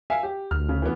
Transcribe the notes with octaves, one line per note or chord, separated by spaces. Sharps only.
E5 F5 G#5
G4
D2 F6
C#3
E3 B3